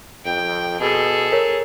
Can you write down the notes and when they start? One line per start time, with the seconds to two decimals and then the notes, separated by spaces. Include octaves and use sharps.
0.25 F2 G5
0.80 B2 G#4 A4
1.32 A#4 C#5